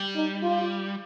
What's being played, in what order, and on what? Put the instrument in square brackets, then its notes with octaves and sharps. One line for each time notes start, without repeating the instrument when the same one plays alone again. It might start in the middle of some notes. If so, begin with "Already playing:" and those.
Already playing: [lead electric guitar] G3
[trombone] D#4
F4